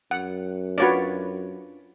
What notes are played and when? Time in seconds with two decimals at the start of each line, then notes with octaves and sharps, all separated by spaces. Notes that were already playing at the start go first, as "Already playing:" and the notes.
0.11 F#2 F#5
0.78 D4 F4 F#4 B4 C#5 D5